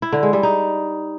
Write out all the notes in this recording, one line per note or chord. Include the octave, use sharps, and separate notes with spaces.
E4
D3
G#3
G3
D#4